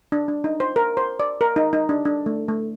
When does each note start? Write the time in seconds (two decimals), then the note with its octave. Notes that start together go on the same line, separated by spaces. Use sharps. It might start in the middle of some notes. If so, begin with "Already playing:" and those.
0.12 D4
0.28 D4
0.44 D#4
0.60 C5
0.76 A#4
0.97 C5
1.20 D5
1.41 A#4
1.56 D#4
1.73 D#4
1.89 D4
2.05 D4
2.26 A3
2.48 A3